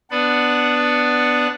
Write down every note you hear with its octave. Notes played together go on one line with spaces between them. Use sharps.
B3 D4 B4 D5 F#5 B5